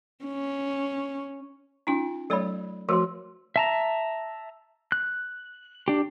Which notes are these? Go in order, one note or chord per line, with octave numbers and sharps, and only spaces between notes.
C#4
C#4 D#4 F4 A5
F#3 A3 A4 C#5 D5 B5
F3 A3 F#4 A#4 C5 C6
E5 A5 A#5
F#6
D4 G4